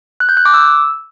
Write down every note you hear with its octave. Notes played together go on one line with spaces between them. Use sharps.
F#6
G6
F#6
D6
E6